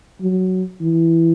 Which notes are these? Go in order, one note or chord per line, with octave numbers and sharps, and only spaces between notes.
F#3
E3